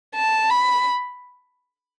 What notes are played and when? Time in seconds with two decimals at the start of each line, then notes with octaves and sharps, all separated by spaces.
0.16 A5
0.50 B5